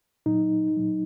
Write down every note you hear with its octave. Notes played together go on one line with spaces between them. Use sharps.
A#2 F#3 D#4
A#2 F#3